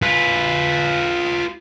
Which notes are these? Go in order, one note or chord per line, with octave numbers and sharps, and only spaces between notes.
F4 B4